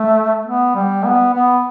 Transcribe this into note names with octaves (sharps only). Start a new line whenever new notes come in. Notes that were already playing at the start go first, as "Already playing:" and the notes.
Already playing: A3
B3
G3
B3
B3